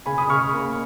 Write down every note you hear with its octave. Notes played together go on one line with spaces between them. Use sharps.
C#3 G#5 B5
B5 D#6
C#3 C#6 F6
A#3